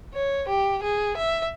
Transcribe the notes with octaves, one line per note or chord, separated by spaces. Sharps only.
C#5
G4
G#4
E5